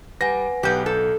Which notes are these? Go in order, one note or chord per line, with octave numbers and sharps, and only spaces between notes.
G3 B4 F#5 G#5 A#6
B1 B3 G4 G6
A4